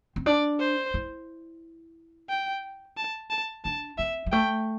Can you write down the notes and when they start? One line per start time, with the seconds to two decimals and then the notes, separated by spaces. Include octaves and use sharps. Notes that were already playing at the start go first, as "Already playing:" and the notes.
0.16 C4
0.26 D4 D5
0.60 C5
0.94 E4
2.29 G5
2.97 A5
3.30 A5
3.65 D4 A5
3.98 C4 E5
4.26 G3
4.32 A3 G5